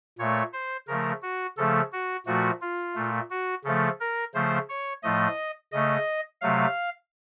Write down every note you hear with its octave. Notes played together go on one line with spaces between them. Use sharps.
A#2 A3 C#5
C5
C#3 F3 A3 A#4
F#4
C#3 F3 A3 A4
F#4
A#2 F3 A3 F#4
F4
A#2 A3
F#4
C#3 F3 A3 A4
A#4
C#3 F3 A3 C5
C#5
A2 F3 A3 D#5
C#3 A3 D#5
C3 F#3 A3 F5